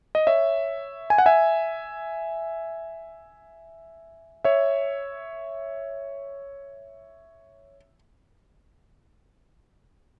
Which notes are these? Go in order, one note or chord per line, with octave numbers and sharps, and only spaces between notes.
D#5
C#5 E5
G#5
F#5
E5 G#5
C#5 E5